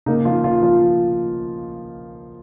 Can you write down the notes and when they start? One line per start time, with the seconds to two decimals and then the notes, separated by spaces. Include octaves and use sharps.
0.06 C#3 A#3 D#4
0.25 F3 F4
0.44 F3 F4
0.63 F3 F4